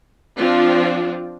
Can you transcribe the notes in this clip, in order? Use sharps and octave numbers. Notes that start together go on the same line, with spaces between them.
F3 C4 D4 F4